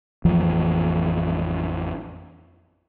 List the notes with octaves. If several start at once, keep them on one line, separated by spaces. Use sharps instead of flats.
A1 F2 E3 F3